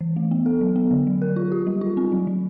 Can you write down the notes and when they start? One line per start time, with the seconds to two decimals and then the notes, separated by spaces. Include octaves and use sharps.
0.01 E3
0.16 A3
0.31 B3
0.46 A4
0.61 F#3
0.76 B3
0.91 D3
1.07 F#3
1.22 A#4
1.36 F4
1.52 G4
1.67 G3
1.81 F4
1.97 C4
2.12 F#3
2.27 F#3